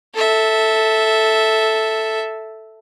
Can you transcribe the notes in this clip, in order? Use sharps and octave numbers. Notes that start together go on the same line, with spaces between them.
A4 E5